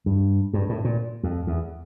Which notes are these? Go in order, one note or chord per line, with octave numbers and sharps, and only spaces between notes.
G2
G2
A2
A#2
F2
E2